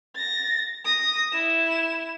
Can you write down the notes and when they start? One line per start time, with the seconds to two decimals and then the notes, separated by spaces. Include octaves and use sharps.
0.15 A6 A#6
0.85 D#6 A#6
1.32 E4 E7